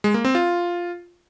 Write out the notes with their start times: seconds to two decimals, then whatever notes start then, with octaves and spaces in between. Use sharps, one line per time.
0.04 G#3
0.14 A#3
0.25 C4
0.35 F4